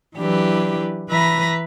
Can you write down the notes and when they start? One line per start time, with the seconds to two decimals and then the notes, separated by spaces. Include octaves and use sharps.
0.17 E3 F#3 D4 E4 G4 B4
1.09 E3 B4 E5 A#5 B5 A#6